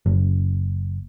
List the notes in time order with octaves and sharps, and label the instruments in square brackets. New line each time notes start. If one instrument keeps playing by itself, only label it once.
[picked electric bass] F#1